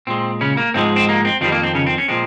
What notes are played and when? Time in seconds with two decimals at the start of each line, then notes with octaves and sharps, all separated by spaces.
0.07 A#2 G#3 C4
0.41 C#3 C#4
0.57 A#3
0.74 G#2 F3 G#3 C4
0.96 C4
1.09 A#3
1.25 C4
1.41 F2 D#3 G3 C4
1.52 A#3
1.63 C4
1.75 C#3 C#4
1.87 C4
1.98 C#4
2.08 A#2 F3 G#3 C4